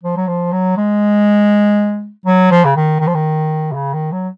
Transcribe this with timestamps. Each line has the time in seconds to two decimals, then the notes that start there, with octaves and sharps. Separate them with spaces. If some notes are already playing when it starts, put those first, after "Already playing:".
0.03 F3
0.17 F#3
0.27 F3
0.52 F#3
0.77 G#3
2.26 F#3
2.51 F3
2.65 C#3
2.76 D#3
3.00 D#3
3.07 F3
3.15 D#3
3.71 C3
3.75 C#3
3.94 D#3
4.12 F#3